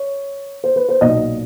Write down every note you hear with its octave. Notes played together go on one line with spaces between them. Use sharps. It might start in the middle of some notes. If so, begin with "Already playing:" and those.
Already playing: C#5
C5
B4
C5
B1 A#2 D#5